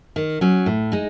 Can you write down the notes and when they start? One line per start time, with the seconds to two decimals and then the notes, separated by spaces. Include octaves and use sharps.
0.16 D#3
0.41 F#3 C#4
0.66 A2
0.92 G#3 D#4